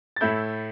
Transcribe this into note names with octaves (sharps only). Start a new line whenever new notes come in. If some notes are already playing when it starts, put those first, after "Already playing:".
A6
A2 A3 E4 G6